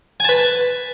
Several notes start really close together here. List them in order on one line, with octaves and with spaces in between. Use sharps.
G#5 A5 B4